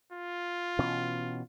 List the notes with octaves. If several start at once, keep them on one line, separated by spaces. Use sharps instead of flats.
F4
B2 E3 C#4